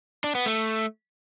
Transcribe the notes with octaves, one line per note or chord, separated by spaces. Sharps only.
D4
B3
A3